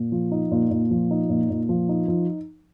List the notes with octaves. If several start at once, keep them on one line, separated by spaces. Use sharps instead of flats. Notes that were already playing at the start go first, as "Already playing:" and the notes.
Already playing: A#2
F3
D#4
A#2
A#2
F3
D#4
A#2
A#2
F3
D#4
F3